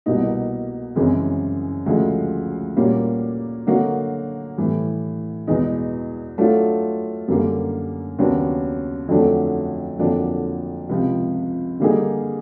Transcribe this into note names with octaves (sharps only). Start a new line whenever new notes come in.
C2 B2 G3 A#3 D#4
F#2 C#3 E3 G#3 C4
D2 C#3 F3 G#3
A#2 G3 A#3 C#4 F#4
D3 F#3 A#3 D#4 F#4
A2 E3 G3
E2 B2 G#3 B3 D#4
F#3 A3 D4 F4
F#2 D3 G3 A#3
D#2 C#3 F#3 B3 D4
F2 D3 F#3 A3 D4
F2 D3 F#3 A#3 D4
C#2 C3 F3
D3 G3 A#3 D#4 G#4